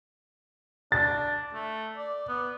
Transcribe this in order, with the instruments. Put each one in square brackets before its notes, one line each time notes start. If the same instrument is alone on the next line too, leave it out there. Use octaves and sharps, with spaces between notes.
[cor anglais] D4 [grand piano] A6
[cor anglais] A3
D5
B3